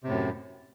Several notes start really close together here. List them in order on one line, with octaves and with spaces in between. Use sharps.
C3 A2 F#2